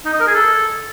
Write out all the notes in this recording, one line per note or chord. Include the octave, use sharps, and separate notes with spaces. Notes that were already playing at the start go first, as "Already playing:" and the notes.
D#4
D#5
A#4
G#4
A4